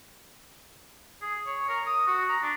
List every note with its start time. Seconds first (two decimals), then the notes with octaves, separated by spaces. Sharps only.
1.22 G#4
1.46 C#5
1.69 A#4
1.86 D#6
2.07 F#4
2.29 A#5
2.43 D4